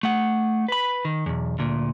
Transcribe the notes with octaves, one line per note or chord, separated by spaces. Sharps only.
A3 F#5
B4 B5
D#3
B1 E2
D2 A#2